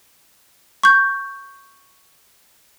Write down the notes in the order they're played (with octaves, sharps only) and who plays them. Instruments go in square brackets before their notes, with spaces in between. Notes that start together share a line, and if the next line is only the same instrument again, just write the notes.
[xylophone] C#6 G6